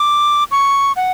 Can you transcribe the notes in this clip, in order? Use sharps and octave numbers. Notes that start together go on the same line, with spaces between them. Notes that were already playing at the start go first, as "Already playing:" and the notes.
Already playing: D6
C#6
F#5